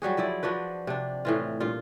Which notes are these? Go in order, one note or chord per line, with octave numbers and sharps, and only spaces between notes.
F#3 G3 F#4 G#4
F3 F#3 E4 D5
F3 D4 F#4 B4
C3 D4
A2 E3 F4
G2 A#2 F4